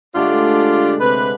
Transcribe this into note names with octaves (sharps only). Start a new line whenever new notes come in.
D3 G#3 A3 D4 F4 G4
C3 B4